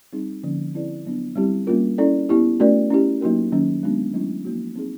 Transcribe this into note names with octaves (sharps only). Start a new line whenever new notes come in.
G3 C4 D#4 G#4
D3 F3 A#3 C#4
C4 E4 G#4 B4 D5
F#3 B3 D4
G3 C4 E4 G4
G3 A#3 C#4 F4 A#4
C#4 E4 A4 D5
B3 E4 G4
A3 C#4 F#4 A#4 D5
C#4 E4 G4
F#3 A#3 D#4 F#4 A#4
D#3 F#3 A#3 C#4
G#3 B3 D4 F#4
F#3 A3 C#4 E4
F3 A#3 D#4 F#4
C4 D#4 G#4